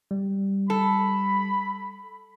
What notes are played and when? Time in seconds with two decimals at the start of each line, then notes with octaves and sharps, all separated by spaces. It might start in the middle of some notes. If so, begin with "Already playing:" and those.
0.11 G3
0.70 A4 B5